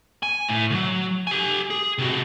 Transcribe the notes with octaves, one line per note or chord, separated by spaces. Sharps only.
G#5
A2
D2 F#3
G4 G#5
G#4
C3 F#4